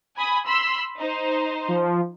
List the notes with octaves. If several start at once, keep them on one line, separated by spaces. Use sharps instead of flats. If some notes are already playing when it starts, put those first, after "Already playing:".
G#5 B5 D#6
B5 C6 E6
D#4 C5
F3